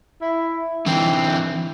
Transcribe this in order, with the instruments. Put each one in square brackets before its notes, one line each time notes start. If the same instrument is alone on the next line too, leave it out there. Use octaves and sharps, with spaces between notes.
[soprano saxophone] E4
[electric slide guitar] D3 E3 [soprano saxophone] C4